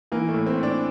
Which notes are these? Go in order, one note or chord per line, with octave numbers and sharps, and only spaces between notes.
E3 A#3
A3
A2
C4
A2
D4